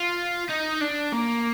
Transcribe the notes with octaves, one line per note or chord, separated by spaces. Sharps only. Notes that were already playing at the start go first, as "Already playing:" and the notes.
Already playing: F4
D#4
D4
A#3